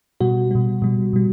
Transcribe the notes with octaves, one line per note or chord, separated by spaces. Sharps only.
B2 G3 F#4
B2 G3
B2 G3
B2 G3